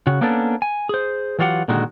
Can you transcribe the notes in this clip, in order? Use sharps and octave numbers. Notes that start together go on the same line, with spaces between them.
C#3 F#4
A#3 B3 C#4 D4 A4
G#5
G#4 C5
E3 F#3 F4 G4 F#5
A#2 D3 D#3 G#3 F#4